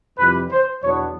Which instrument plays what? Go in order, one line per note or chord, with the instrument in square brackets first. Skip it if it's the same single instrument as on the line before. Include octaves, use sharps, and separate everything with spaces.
[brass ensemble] F2 C3 E3 G3 B4
C5
E2 B2 F#3 B3 D4 C#5